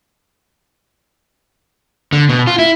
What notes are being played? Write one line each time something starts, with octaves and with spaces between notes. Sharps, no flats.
D3
B2
F4
E4